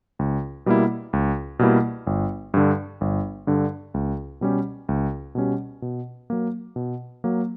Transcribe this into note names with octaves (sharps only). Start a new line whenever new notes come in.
C#2
B2 G3 A#3 E4
C#2
B2 G3 A#3 E4
G1
G2 D3
G1
G2 D3
C#2
B2 G3 C#4 G4
C#2
B2 G3 C#4 G4
B2
F#3 A#3
B2
F#3 A#3